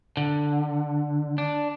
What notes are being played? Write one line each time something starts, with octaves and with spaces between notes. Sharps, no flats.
D3
D4